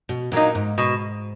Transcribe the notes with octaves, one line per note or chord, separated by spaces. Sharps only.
B2
A#2 F#3 A#3 D#4
G#2
G#2 B2